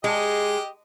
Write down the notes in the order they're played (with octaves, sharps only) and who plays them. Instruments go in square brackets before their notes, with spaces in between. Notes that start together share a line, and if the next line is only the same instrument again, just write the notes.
[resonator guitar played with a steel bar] G#3 [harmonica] G4 D#5